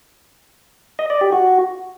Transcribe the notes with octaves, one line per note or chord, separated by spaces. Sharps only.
D#5
D5
G4
F#4